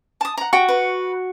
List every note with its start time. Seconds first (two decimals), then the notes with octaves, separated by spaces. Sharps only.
0.21 A5 D#6
0.38 F#5 A#5
0.53 F#4 G5
0.68 B4